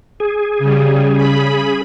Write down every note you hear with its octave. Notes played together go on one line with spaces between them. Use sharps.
G#4
C#3 G3
C#3 B5